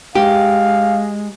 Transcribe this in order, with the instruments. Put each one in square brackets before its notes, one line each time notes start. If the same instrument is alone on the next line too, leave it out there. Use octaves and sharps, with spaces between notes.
[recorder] G#3 [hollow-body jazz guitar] G4 [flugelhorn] F5